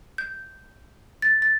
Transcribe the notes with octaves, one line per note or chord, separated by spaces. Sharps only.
G6
A6
A6